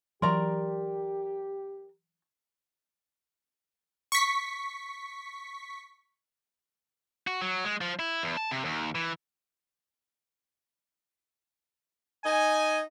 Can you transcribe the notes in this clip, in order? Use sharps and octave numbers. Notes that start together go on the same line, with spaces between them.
E3 F#3 G4 A#4 D5 A#5 C6
C#6 B6
F#4
F#3
G#3
F3
E4
E2
A5
C3
D#2
E3
D#4 G#5